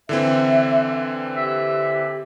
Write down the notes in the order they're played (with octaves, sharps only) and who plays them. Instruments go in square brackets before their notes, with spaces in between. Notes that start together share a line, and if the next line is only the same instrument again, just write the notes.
[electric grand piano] D3 E3 C4 [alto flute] E5
[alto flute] G4 [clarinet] E5